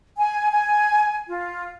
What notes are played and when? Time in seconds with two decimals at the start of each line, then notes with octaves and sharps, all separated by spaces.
0.17 G#5
0.51 G#5
1.28 F4